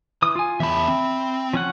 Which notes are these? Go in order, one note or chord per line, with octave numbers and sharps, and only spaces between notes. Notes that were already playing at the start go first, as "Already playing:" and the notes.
E3 D#6
F4 G#5
E2 E5 A5 B5
C4
F3 C#4 F#5